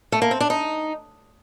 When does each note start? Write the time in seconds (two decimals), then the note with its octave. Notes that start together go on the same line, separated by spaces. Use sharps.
0.12 A3
0.22 A#3
0.31 C4
0.40 D4
0.50 D#4